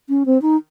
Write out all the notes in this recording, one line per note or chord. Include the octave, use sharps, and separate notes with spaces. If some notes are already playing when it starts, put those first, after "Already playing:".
C#4
C4
D#4